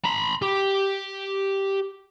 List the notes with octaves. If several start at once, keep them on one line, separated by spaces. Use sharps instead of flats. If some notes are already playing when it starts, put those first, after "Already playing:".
A#5 B5
G4